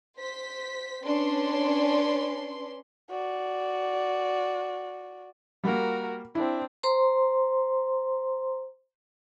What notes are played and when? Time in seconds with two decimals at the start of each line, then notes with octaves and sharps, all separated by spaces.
0.18 C5 B6
1.04 C#4 D4 B4 C6
3.10 F#4 D5
5.64 G3 A#3 F#4 A#4
6.35 C4 D4 E4
6.83 C5 A#5 C6